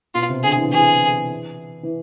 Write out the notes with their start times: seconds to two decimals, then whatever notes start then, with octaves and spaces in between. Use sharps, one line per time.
0.15 B2 F4
0.29 C3
0.43 D3 G#4
0.58 E3
0.72 E3 G#4
1.83 E3